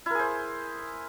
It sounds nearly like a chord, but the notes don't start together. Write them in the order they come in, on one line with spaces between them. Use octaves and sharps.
E4 A#4 G#4 C5